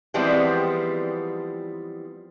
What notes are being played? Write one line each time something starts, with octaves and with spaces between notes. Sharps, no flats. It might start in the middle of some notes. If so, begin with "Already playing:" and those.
E3 F3 G3 G#3 B3 C4